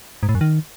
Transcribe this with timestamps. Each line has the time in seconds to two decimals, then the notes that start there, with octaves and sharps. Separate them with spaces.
0.23 G#2
0.29 A2
0.35 F#2
0.41 D#3